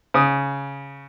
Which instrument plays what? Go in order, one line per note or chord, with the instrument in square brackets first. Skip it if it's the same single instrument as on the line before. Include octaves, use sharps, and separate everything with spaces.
[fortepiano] C#3 D#6